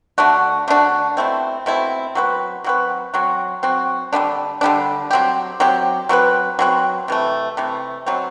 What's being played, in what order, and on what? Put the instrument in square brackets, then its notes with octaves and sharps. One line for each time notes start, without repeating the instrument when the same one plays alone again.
[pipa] D3 A3 D4 F#4
D3 A3 D4 F#4
B2 A3 C4 E4
B2 A3 C4 E4
F#3 C4 F#4 B4
F#3 C4 F#4 B4
F#3 C4 F#4
F#3 C4 F#4
D3 G3 B3 D4
D3 G3 B3 D4
F#3 C4 G4
F#3 C4 G4
F#3 C4 F#4 B4
F#3 C4 F#4 B4
C3 E3 A3
C3 E3 A3
B2 F#3 C4